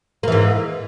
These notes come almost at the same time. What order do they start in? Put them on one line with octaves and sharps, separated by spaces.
A#3 E3 G#2